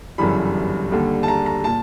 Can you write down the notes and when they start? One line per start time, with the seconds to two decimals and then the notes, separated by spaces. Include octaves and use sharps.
0.18 G1 F#2 C#3 E3 G3 B5
0.91 D#2 D3 G3
1.23 A5
1.28 A#5
1.46 A#5
1.64 A#2 A5